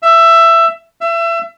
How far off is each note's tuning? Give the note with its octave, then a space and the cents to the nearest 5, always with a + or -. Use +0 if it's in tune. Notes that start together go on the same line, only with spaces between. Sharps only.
E5 +15
E5 +30